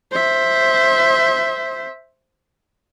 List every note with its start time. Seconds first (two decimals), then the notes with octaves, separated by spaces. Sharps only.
0.12 C5 E5